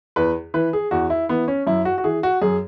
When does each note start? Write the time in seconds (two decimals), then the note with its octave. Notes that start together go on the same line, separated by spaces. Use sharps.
0.16 E2 B4
0.54 E3 B4
0.73 G#4
0.91 E2 F#4
1.10 E4
1.29 E3 B3
1.48 C#4
1.67 F#2 E4
1.85 F#4
1.98 F#4
2.04 E3 G#4
2.23 F#4
2.42 F#2 G#4